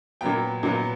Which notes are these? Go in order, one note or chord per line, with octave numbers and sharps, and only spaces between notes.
A#2 F#3 B3 G5
A#2 F#3 B3